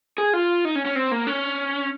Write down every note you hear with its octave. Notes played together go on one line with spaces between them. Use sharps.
G#4
F4
D#4
C#4
C#4
C4
A#3
C#4